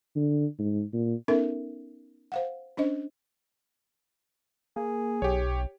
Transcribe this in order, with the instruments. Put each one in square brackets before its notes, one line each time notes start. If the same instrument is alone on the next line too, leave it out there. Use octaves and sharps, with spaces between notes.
[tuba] D3
G#2
A#2
[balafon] B3 C#4 D#4 A4 A#4 E5
C5 F5 F#5
C#4 D4 C5 D#5
[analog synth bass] A#3 [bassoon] G#4
[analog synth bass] B1 [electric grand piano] G4 C#5